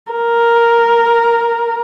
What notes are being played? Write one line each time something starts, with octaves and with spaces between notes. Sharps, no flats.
A#4